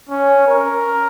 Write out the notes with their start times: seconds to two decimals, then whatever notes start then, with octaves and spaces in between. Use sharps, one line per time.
0.09 C#4
0.47 A#4